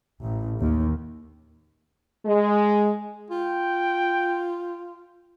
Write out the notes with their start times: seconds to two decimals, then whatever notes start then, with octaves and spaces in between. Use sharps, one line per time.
0.23 A1
0.59 D#2
2.26 G#3
3.30 F4 G5